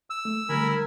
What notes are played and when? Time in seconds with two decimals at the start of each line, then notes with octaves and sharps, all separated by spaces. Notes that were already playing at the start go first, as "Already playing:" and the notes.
0.10 E6
0.25 A3
0.49 D3 G3 A3 A#4 G#5 B5